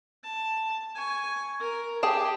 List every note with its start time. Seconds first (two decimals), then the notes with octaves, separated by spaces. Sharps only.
0.23 A5
0.95 G#5 C#6
1.60 A#4
2.03 G4 G#4 G5 A5